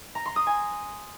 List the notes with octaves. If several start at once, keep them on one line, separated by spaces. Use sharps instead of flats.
A#5
C6
D#6
G#5